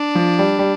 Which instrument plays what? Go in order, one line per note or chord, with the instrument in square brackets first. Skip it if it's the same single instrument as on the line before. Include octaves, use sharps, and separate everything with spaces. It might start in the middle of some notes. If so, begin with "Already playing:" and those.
Already playing: [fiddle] D4
[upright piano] F3
G3
G3